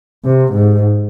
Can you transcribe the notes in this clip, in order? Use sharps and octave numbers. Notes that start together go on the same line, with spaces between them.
C3
G#2